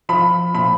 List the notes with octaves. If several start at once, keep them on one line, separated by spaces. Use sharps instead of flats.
F3 B5
A#2 B5